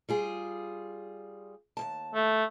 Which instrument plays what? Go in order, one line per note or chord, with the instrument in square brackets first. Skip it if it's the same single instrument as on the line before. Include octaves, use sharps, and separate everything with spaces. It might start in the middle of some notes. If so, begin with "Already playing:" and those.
[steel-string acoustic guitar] G3 F4 G#4
D#2 G#2 A5
[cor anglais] A3